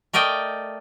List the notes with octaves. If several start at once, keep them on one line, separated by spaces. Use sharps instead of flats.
A3 A#4 D5 D#5 G5